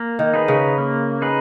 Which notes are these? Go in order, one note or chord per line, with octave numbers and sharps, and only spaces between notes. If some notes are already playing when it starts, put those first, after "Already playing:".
Already playing: A#3
D#3
D#4 G#4 B4
C#3
A#3
D#4 G#4 B4